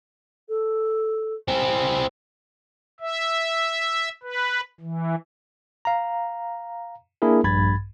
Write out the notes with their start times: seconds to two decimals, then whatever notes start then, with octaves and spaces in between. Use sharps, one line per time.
0.49 A4
1.48 C4 E4 G#5
3.00 E5
4.23 B4
4.81 E3
5.85 F5 A#5
7.22 A#3 D4 E4 G#4 A#4
7.44 A#1 G2 B5 G#6 A6